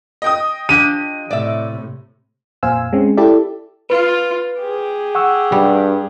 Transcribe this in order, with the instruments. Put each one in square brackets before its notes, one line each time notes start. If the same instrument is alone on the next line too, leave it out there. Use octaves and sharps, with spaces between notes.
[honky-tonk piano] D#5 G5 D#6
[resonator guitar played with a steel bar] F3 D4 G4 [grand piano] D#7
[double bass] A2 C3 [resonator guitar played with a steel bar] D5 E5
[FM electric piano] F2 A#2 C5 F5 G#5 E6
G#3 C4 C#4
E4 G4 A4 D5 E5
[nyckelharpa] F4 [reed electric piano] B4
[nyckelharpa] G4 G#4
[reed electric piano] F#5 C#6 E6
[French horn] G2 [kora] G3